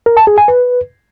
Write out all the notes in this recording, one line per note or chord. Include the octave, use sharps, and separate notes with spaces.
A#4
A5
G#4
G#5
B4